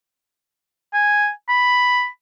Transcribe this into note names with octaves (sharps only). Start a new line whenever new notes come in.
G#5
B5